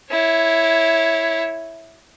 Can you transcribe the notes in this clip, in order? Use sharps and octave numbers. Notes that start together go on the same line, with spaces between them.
E4 C#5